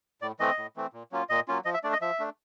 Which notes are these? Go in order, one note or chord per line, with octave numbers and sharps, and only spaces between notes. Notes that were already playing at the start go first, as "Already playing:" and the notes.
A2 D5
E3 A3 C4 D#5
A2
E3 A3 C4
A#2
F#3 A#3 C#4 F4
A#2 D#5
F#3 A#3 C#4 F4
F3 D#5
E5
A3 D4 D5
D#5
F3 E5
A3 D4